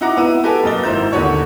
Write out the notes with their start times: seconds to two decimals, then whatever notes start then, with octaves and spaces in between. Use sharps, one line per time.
0.01 D#4 E4 F#4 F#5 A#5 D6
0.17 B3 E4
0.43 F#4 G4 A4 B4 G5 G#5
0.63 F#2 A#3 D#5 A6 G7
0.84 G#1 E4 C5 A#5 G6
1.12 D#2 D3 F#4 C#5 C#6